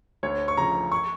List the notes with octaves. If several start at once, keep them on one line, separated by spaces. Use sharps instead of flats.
D2 C#5
C#6
C#3 F3 A#5
C#6